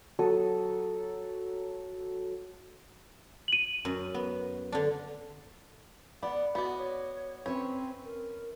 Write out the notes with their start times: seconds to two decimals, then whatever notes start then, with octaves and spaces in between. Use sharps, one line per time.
0.19 F#3 A4 D#6
3.48 D#7 F#7
3.85 F#2
4.14 B3
4.72 D3 D4
6.23 B3 D5 F#5
6.55 B3 F#4 D5 D#5
6.78 C#5
7.46 C4 C#4 B4 C#5 E5
8.05 A#4